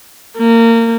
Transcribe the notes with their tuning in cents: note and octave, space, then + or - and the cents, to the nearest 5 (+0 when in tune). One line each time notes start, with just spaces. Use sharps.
A#3 -25